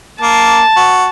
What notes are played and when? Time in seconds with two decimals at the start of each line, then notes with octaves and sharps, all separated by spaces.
0.21 A#3 A5
0.76 F#4